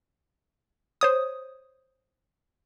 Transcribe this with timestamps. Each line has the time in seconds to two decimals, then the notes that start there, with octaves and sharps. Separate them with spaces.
1.01 C5 C#5 D#6